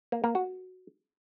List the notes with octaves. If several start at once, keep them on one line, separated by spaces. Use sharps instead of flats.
A#3
A#3
F#4